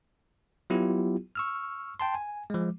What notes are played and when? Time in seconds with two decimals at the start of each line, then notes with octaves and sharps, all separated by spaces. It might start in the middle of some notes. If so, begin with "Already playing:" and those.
0.70 F#3 B3 E4 F4 G4
1.35 C#6 E6 F6
2.00 G5 A5 C6
2.14 G#5
2.50 F3 G#3